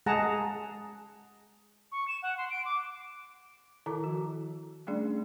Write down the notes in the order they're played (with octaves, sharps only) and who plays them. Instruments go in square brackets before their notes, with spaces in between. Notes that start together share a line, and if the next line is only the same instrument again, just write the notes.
[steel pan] G#3 G#4 F#5 A5 A#5
[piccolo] C#6
E7
F#5
C6
D7
D6
[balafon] D#3 E4 A4 A#4 A5 A#5
F3 F#4
G3 A3 C#4 D4 G#4 D5